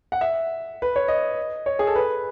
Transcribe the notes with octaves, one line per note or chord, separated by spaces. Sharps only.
F#5
E5
B4
C#5
D#5
C#5
G#4
A4
B4